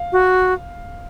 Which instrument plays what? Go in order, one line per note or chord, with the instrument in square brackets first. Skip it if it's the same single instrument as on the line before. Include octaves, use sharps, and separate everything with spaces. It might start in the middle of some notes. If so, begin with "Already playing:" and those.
Already playing: [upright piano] F5
[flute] F#4